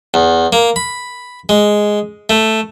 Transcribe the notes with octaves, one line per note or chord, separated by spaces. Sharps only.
E2
A#3
B5
G#3
A3